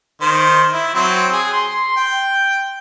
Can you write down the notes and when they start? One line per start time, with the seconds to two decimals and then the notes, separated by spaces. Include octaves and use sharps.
0.21 D#3 C5
0.73 E4
0.94 F#3 C4
1.32 G#4
1.53 C6
1.97 G5